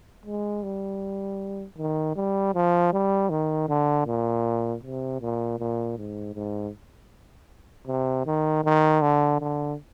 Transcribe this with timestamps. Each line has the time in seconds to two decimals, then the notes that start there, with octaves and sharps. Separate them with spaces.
0.26 G#3
0.63 G3
1.78 D#3
2.16 G3
2.54 F3
2.93 G3
3.30 D#3
3.69 D3
4.07 A#2
4.83 C3
5.21 A#2
5.59 A#2
5.98 G#2
6.35 G#2
7.88 C3
8.26 D#3
8.64 D#3
9.02 D3
9.40 D3